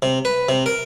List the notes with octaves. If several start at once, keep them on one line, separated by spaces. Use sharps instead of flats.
C3
B4
C3
A#4